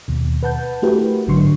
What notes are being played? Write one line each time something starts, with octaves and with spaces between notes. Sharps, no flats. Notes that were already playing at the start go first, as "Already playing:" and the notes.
D#2 B2
B4 F#5 A5 G6
A3 E4 F#4 G4 A#4 B4
A1 G#2 D3 F#3 C6 C#6